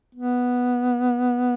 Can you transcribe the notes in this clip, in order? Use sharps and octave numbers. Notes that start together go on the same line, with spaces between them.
B3